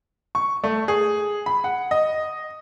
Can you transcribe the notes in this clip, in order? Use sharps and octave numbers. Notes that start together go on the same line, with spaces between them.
C#6
A3
G#4
B5
F#5
D#5